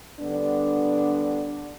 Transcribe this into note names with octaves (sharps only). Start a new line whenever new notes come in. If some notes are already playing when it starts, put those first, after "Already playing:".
D3 G3 B3 D4